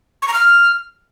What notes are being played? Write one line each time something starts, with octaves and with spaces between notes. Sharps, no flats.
C#6
A#5
F6